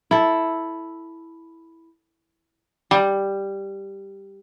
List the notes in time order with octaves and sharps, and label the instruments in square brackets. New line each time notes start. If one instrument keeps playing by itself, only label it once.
[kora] E4 A4
[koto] G3